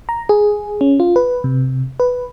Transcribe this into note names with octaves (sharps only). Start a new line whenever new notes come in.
A#5
G#4
C#4
F4
B4
C3
B4